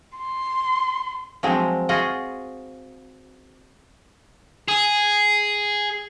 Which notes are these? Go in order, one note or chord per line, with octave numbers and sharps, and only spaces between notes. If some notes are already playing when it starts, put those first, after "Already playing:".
C6
F3 F#3 G#3 C4
F4 F#4 G#4 D#5
G#4